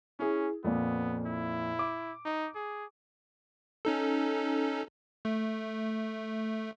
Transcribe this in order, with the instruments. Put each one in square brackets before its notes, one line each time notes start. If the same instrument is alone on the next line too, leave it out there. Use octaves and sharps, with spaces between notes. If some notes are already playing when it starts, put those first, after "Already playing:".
[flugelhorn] C#4 [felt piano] E4 G#4
[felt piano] F2 A#2 [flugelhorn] B3
[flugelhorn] E4
[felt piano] D6
[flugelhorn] D#4
G#4
[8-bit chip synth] C#4 D#4 A4
A3